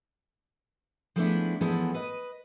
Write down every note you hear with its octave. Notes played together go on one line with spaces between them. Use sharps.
F3 G#3 A3 B3 D4 E4
E2 F3 G#3 B3 E4 A4
B4 D#5